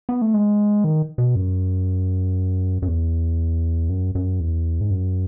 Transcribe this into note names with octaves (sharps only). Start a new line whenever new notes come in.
B3
A3
G#3
D#3
B2
F#2
F#2
E2
F#2
F#2
E2
G#2
F#2